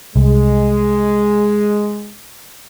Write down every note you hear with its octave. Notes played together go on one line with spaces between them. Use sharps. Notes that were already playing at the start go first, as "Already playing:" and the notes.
C2 G#3